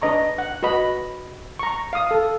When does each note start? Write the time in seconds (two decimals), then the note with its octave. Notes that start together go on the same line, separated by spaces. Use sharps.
0.02 D4 B4 D#5 A#5 C#6
0.38 F#5
0.63 F#4 B4 D#5 B5
1.59 A#5 C#6
1.93 F5 D#6
2.11 A4